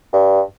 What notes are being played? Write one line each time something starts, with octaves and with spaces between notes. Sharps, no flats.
G2